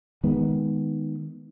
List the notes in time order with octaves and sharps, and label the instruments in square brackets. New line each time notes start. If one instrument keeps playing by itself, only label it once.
[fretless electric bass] D#3 G#3 B3